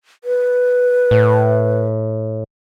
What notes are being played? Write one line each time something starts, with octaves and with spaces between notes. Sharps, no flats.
B4
A2